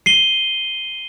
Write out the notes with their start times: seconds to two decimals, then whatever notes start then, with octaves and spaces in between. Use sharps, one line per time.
0.06 C7 D#7 G7